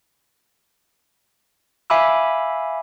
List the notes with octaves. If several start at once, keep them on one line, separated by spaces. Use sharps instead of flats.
E5 F5 G#5 B5 D6 E6